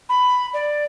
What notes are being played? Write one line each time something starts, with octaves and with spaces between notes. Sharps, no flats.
B5
D5